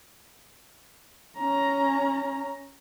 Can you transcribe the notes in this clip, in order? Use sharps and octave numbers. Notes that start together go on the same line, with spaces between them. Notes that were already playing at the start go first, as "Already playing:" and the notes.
C#4 A#5